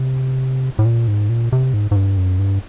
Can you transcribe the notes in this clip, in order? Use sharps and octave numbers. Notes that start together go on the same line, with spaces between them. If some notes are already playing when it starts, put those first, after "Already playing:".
Already playing: C3
A2
A#2
G#2
A#2
C3
G#2
G#2
G2
F#2
G2